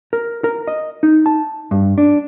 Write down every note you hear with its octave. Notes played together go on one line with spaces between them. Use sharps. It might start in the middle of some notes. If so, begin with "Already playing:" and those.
A#4
A#4
D#5
D#4
A5
G2
D4